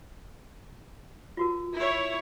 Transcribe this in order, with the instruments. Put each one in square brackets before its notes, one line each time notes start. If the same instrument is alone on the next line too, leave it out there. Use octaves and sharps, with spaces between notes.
[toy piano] F4 F#4 A#4
[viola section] E4 C#5